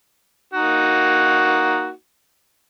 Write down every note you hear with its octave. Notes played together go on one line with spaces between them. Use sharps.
A#3 D#4 F#4